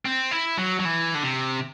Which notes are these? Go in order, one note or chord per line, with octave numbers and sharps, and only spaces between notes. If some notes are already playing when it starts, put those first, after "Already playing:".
C4
E4
F#3
F#3
E3
D3
C3